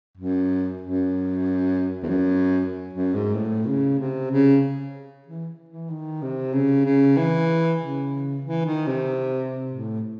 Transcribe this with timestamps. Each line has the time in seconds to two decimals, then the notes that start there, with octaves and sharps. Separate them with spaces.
0.17 F#2
0.81 F#2
2.03 E2
2.08 F#2
2.93 F#2
3.14 G#2
3.35 A2
3.67 C#3
3.99 C3
4.31 C#3
5.27 E3
5.69 E3
5.90 D#3
6.22 C3
6.53 C#3
6.85 C#3
7.17 E3
7.81 C#3
8.44 E3
8.65 D#3
8.87 C3
9.72 A2